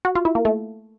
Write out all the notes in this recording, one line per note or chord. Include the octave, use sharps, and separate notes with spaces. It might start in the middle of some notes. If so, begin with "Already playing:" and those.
F#4
F4
E4
A#3
A3